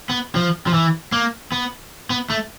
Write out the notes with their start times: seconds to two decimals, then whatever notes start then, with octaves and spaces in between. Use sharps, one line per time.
0.09 B3
0.35 F3
0.67 F3
0.74 E3
1.12 A#3
1.52 B3
2.10 B3
2.30 A3